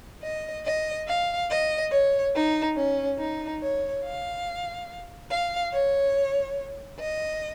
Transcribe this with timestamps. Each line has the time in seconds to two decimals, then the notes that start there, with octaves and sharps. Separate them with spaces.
0.23 D#5
0.65 D#5
1.08 F5
1.50 D#5
1.92 C#5
2.34 D#4
2.77 C#4
3.19 D#4
3.62 C#5
4.04 F5
5.31 F5
5.73 C#5
7.00 D#5